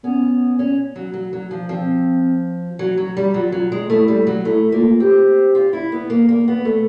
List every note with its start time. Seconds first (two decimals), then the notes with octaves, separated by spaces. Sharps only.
0.03 B3 C#4
0.59 C#4
0.96 F#3
1.14 F#3
1.33 F#3
1.51 F3
1.69 F3 C4
2.79 F#3
2.97 F#3
3.17 G3
3.34 F#3 F4
3.52 F#3
3.72 G#3
3.90 A3 E4
4.08 G3
4.27 F#3
4.45 A3 E4
4.72 A#3 F4
5.00 C4 G4
5.55 F4
5.73 E4
5.92 B3
6.10 A#3
6.29 A#3
6.48 B3
6.65 A3